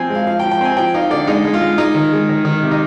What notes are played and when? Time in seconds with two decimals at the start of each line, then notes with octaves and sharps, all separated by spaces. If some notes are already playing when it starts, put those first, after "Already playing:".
Already playing: F3 C4 G#5
0.10 G#3
0.15 F5
0.27 F3 F5
0.40 G5
0.43 F3
0.51 G5
0.61 C4 G#5
0.77 F3 G5
0.94 D#4 F5
1.10 D3 D5
1.27 G#3 D#4
1.45 G#3
1.54 F4
1.62 G#3
1.78 G#3 D#4
1.95 D#3
2.12 G#3
2.29 D#3
2.45 D#3
2.63 C3
2.71 D#4